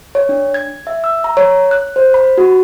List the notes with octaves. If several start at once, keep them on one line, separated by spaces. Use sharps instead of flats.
C#5
D4
G#6
E5
E6
A#5
C#5
F#6
C5
B5
F#4